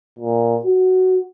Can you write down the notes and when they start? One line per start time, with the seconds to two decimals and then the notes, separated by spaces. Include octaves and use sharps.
0.19 A#2
0.65 F#4